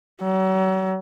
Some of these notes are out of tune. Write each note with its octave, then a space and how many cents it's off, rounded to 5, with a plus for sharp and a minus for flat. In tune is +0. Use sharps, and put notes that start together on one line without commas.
F#3 +35